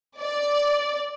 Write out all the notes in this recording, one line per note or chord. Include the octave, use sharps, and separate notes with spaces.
D5